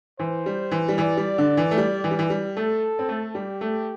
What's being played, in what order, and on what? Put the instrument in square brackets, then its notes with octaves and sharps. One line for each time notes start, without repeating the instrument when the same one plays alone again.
[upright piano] E3 [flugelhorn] C5
[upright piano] G3
E3
G3
[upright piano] E3 [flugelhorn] D5
[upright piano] G3
D3
E3
A3
G3
E3
G3
E3
G3
[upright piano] A3 [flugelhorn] A4
[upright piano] C4
A3
[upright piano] G3 [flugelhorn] G4
[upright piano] A3